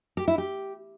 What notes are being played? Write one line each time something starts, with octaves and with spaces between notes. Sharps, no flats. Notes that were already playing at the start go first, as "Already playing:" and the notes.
G4
E4
G4